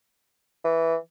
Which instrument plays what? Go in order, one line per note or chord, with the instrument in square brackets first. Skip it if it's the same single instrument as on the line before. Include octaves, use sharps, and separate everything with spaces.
[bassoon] E3